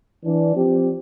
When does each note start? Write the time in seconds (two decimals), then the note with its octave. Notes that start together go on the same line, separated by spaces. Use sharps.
0.23 E3 D4
0.55 F3 C4 G4